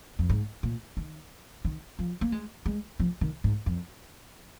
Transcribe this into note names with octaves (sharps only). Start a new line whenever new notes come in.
F2
G#2
A#2
D#3
D#3
F3
A#3
G#3
G#3
F3
D#3
G#2
F2